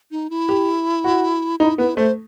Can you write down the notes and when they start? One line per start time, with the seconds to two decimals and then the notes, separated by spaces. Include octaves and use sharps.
0.11 D#4
0.30 E4
0.49 G4
1.04 F#4
1.60 D#4 E4
1.78 B3 E4
1.97 A3 C5